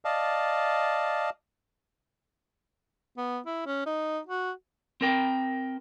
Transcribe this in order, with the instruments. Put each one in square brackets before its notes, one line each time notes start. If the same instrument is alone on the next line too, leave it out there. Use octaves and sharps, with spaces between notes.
[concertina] D5 D#5 F5 A5
[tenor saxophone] B3
E4
C#4
D#4
F#4
[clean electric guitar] C4 A#4 G5